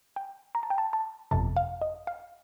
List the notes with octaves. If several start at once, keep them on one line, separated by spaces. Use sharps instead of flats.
G5
A#5
A5
G5
A5
A5
G1 F2 C3 A5
F5
D#5
F5